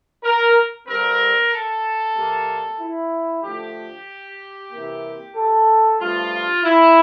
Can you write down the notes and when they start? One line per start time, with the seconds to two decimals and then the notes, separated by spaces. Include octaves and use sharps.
0.24 A#4
0.87 G2 D3 G3 C4 A#4
1.52 A4
2.16 C3 G3 A#3
2.80 E4
3.43 D3 F3 A3 G4
4.72 C3 E3 A#3
5.36 A4
6.00 G2 F3 A3 F4
6.64 E4